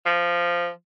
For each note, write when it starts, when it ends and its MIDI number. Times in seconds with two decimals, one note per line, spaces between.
0.06 0.69 53